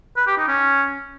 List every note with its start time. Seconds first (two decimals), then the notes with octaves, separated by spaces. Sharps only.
0.16 B4
0.27 G4
0.37 D#4
0.48 C#4